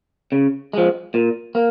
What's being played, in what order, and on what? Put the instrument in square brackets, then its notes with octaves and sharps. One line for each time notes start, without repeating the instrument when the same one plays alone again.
[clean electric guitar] C#3
F3 G#3
A#2
A#3